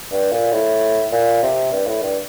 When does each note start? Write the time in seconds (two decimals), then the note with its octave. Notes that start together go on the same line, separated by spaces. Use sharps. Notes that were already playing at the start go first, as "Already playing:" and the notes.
0.12 G2
0.32 A#2
0.52 A2
1.12 A#2
1.43 C3
1.72 G2
1.87 A2
2.02 G2